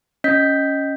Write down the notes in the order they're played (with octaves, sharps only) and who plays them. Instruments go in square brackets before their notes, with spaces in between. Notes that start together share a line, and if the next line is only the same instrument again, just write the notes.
[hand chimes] C#4 D#5 G6 B6